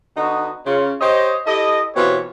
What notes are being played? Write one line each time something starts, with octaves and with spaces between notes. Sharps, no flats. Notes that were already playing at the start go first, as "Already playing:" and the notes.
D3 B3 D#4 F#4
C#3 F4
G4 C5 C#5 D#5
E4 G4 A4 D#5
B2 E3 C4 F4 G4 C#5